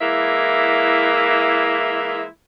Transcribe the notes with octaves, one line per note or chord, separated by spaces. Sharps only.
E3 G#3 A#3 E4 E5